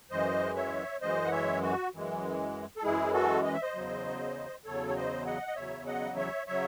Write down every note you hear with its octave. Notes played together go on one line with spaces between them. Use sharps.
F#2 E3 G#3 C5 D#5
C#5 E5
F#2 E3 G#3 C5 D#5
F#5
C#5 E5
F#4
F#2 E3 G#3
A4
F#2 E3 G#3 E4 G#4
F#4 A4
D#5
E5
C5 D#5
E2 C#3 F#3
E2 C#3 F#3 A4 C#5
C#5
C5 D#5
D#5 F#5
D#5
E2 C#3 F#3 C#5 E5
D#5 F#5
C#5 E5
C#3 F#3 C#5 E5